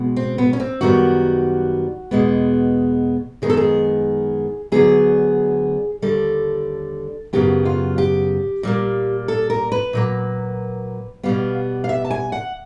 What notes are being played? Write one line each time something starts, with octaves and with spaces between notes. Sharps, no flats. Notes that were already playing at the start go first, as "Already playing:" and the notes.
Already playing: B2 G#3 B3
C4
B3
C#4
C4
F#2 D#3 G3 B3 F#4
E2 B2 G#3 B3
F#2 D#3 G#3 B3 G#4
A4
G#4
D2 D3 F#3 B3 G#4
D#2 D3 G3 A4
F#2 C#3 F#3 B3 G4
F4
G4
A#2 G3 A#3
A4
A#4
B4
A#2 F#3 A#3
B2 G3 B3 F5
F5
E5
A5
G#5
F#5